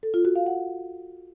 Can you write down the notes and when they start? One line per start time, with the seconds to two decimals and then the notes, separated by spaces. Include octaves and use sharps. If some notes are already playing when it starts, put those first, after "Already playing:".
0.03 A4
0.14 F4
0.25 F#4
0.36 F5
0.46 F#5